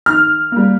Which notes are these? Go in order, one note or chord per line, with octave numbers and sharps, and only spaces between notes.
D#3 F6
G3 A#3